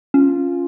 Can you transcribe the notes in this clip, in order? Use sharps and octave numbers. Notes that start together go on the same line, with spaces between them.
C#4 F4